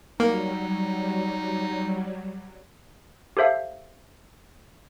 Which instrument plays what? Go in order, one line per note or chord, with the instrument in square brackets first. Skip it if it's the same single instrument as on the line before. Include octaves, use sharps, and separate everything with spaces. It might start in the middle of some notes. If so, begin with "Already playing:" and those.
[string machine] F#3 G3 [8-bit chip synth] A#3 [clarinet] D#4
[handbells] G4 A4 C5 E5 F5